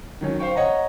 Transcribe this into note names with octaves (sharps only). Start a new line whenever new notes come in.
D#3 F#3 C#4
C5 F5 G5 C#6
C#5 D#5 F#5 A#5